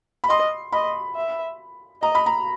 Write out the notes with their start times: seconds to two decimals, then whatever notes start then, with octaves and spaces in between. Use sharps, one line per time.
0.24 B5
0.29 D#5 C6
0.72 D#5 B5
1.16 E5
2.02 D#5 A#5
2.15 B5
2.26 A#5